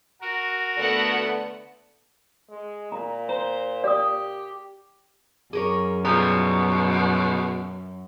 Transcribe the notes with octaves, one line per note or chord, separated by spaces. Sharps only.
F#4 A#4
D3 A3 B3 F#5
G#3
A#2 A#5
C5 A#5
G4 D5 D#6
F#2 G#4 A#4 C#5
B2 G3 F4 G#4 A#5 C#6